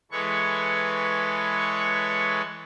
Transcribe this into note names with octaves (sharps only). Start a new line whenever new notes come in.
E3 G#3 A4 B4 C#5 C#6